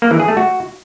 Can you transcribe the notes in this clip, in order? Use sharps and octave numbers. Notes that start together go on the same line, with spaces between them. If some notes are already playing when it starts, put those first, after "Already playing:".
A#3
E3
G#4
A3
F#4